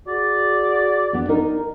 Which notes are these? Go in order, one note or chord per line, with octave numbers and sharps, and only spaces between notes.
F#4 G#4 D5
B3 D4
D#4 A#4